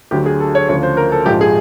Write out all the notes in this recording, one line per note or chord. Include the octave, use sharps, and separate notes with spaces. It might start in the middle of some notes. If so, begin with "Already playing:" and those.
D2 D3 F#3 G4
G#4
A4
C#5
D2 C#3 F3 C#5
C5
A#4
A4
A#1 G#2 F3 G4
G#4